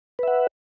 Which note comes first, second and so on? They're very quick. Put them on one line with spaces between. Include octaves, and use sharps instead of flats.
B4 E5 F#5